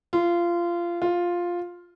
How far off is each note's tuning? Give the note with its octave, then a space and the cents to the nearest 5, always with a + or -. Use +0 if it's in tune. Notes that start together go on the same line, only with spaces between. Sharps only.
F4 -20
F4 +5